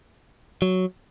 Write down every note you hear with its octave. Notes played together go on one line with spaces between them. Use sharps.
F#3